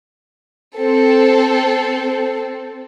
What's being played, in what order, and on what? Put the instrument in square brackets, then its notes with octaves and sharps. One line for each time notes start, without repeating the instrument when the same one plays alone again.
[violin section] C4 A4